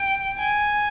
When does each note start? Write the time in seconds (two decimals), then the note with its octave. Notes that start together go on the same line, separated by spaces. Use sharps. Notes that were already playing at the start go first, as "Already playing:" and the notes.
Already playing: G5
0.39 G#5